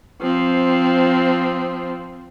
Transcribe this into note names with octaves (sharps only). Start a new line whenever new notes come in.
F3 C4